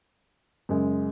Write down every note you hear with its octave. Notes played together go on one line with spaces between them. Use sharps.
F#2 C#3 G#3